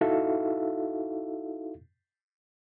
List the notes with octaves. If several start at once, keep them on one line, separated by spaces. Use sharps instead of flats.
D#4 E4 F#4 A4 E5 F5